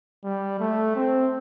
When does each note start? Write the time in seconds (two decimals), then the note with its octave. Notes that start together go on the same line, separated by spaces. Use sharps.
0.24 G3
0.60 A3
0.96 C4